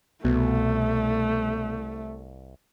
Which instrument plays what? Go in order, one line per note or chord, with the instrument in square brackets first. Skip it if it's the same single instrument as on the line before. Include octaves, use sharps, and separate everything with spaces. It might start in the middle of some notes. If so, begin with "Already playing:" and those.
[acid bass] C2 [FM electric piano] B2 [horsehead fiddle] A3